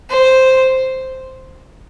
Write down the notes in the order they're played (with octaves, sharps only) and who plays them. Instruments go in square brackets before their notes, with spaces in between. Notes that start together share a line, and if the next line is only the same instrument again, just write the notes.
[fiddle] C5